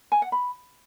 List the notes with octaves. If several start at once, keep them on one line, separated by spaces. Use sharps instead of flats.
G#5
F#5
B5